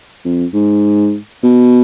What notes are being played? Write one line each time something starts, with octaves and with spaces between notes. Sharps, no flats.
F2
G#2
B2